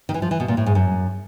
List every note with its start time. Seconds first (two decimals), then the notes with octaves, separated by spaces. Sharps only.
0.09 D#3
0.14 E3
0.22 F3
0.31 E3
0.40 B2
0.48 A#2
0.57 A2
0.66 G#2
0.75 F#2